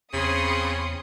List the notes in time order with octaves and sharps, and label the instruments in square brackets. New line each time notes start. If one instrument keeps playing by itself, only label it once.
[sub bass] E2 [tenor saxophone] C#3 [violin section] C4 D#6 C#7 [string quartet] B5 C6 G#6